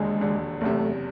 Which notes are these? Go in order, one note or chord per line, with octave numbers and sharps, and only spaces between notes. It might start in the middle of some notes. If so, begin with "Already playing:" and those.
Already playing: E1 D#2 D3 G#3
E1 D#2 D3
F#1 E2 C3 A3